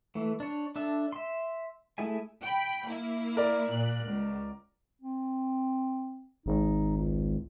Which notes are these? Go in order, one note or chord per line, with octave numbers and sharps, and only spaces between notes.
E3 A3
D4 C#5
D4 A4 E5
E5 C6
A3 E4 G#4 E5 G#5
G5 B5
A#3 E4
A#4 D5
A#2 F#6
C#2
C4
G#1 D#4
C#2